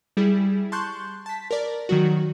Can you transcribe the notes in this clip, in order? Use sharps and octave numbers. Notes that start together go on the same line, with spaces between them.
G3 E4 G#4
A5 C6 C#6 F#6 G6
A5 B6
A#4 D5
D#3 F#3 F#4